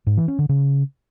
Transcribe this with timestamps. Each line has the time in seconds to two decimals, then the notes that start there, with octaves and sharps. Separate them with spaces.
0.07 G#2
0.17 E3
0.28 C#4
0.39 D3
0.49 C#3